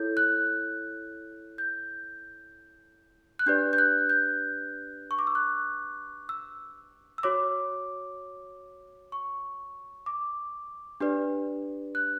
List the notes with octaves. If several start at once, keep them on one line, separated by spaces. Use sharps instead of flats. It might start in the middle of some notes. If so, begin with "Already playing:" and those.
Already playing: E4 A4 C#5 G6
F#6
G6
F#6
D4 G4 B4 D5 G6
G6
F#6
G6
C#6
D6
E6
F#6
E6
E6
F#4 C#5 D6
C#6
D6
D4 G4 B4 D5
F#6